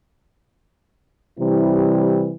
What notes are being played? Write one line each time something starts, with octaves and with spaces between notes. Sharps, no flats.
C3 E3 G3 E4